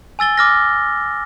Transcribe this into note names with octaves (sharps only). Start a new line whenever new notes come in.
G#5 E6 A6 G7
D6 F6 A#6